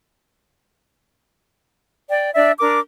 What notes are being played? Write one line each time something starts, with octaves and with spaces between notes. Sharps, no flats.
D5 G5
D4 D5 E5
D4 A#4 D6